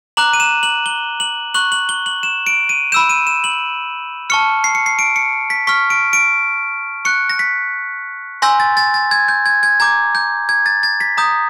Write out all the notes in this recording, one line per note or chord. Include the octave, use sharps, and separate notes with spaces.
A#5 D6 F#6 F#7
D#7
E7
F#7
G7
F#7
C#6 F#6 F#7
F#7
G7
F#7
E7
D7
D#7
B5 E6 G6 E7
D#7
E7
F#7
A5 C#6 F6 C#7
C7
C#7
C7
D7
C#7
B6
C#6 F6 B6
D7
D7
C#6 F#6 C#7
A#6
B6
G#5 C6 E6 G6 A#6
A6
A6
A6
G#6
G6
G#6
G#6
A#5 D6 G6 G#6
G6
G#6
A6
A6
B6
A#5 D#6 G6